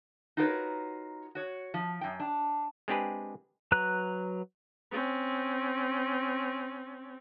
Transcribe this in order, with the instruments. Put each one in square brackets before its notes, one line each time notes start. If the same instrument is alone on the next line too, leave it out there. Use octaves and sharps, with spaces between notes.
[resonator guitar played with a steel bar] D#4 F4 F#4 A#4 B4 C#5
F#4 C#5
F3
F#2 G5
D4
[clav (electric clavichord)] G#3 C4 D4 G4 G#4 B4
[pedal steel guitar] F#3 B4 A#5 F#6
[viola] C4 C#4